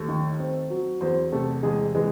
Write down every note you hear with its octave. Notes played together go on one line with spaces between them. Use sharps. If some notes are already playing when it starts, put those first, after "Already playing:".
Already playing: D#2 A3 A4
D#3
C4
F#3
E2 C4 C5
C3 A3 A4
E2 G#3 G#4
E3 G#3 G#4